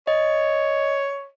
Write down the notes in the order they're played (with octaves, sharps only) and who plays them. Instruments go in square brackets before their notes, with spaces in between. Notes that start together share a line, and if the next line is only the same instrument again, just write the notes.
[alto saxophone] C#5 [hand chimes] D#5